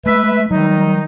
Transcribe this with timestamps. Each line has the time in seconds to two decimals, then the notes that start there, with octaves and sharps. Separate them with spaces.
0.06 G#3 A3 B4 E5
0.51 D#3 F#3 G3 D#4